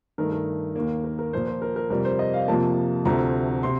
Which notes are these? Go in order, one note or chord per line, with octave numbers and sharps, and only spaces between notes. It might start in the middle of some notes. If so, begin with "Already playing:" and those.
G2 D#3 A3 A#4
A#4
D#2 D#3 A#3
A#4
A#4
A#2 F3 A#3 C5
C5
A#4
A#4
F2 C3 G3 A#4
C5
D#5
F5
F2 C3 F3 A#3 A5
D2 C3 F3 A3 C4 A#5
C3 C6